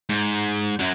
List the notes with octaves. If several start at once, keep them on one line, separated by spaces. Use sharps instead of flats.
G#2
F#2 F#3